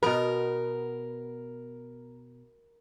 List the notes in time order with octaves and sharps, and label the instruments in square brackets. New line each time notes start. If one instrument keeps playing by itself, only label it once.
[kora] B2 B3 [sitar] A#4